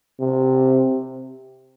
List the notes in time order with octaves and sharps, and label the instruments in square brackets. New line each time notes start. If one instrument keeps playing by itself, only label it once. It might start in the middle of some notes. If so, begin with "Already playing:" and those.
[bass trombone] C3